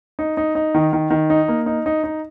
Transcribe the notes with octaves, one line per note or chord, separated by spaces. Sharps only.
D#4
D#4
D#4
D#3
D#3
D#3
D#4
A#3
D#4
D#4
D#4